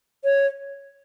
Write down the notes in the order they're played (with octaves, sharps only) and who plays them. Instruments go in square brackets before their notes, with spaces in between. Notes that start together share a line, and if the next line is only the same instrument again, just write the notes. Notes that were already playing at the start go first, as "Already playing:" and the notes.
[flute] C#5